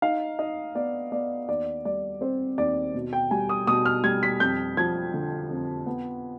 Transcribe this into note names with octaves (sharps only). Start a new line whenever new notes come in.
D#4 F5
D#4 D#5
B3 D5
B3 D5
D#2 D5
G3 D5
C4 C5
D#2 D5
B2
G5
G3 G#5
D#6
B2 D#6
F6
G3 G#6
B6
F2 G6
F3 G#6
D3
F2
B3